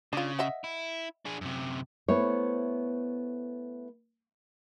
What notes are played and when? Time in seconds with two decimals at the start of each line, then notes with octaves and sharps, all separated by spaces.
0.13 C#3 D4 F4
0.39 D#5 E5 F#5
0.64 E4
1.25 D4 G#4
1.41 F#2 C3
2.08 A3 B3 E4 C5 C#5